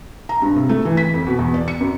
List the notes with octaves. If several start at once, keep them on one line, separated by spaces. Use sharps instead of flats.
A#5
G2
C3
A3
E3
B6
F2
B2
E2
D5
C#7
F#2